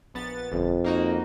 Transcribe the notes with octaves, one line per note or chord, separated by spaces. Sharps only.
A#1 B3 A6
G1 F2
A#3 D#4 F#4